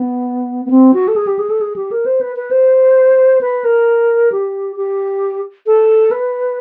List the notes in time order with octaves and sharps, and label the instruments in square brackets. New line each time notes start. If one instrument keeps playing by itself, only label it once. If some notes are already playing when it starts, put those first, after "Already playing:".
Already playing: [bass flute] B3
B3
C4
F#4
A4
G#4
G4
G#4
A4
G#4
G4
A#4
C5
B4
B4
C5
B4
A#4
G4
G4
A4
B4